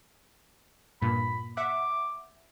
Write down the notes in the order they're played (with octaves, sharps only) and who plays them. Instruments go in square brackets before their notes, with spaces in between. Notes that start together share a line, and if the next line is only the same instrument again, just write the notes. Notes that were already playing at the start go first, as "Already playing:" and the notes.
[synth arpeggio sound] G2 A#2 [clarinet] B5
[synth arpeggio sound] E5 F#5 [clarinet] D6